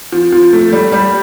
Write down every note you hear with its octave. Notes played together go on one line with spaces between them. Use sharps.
F3
F3
A3
G3
G3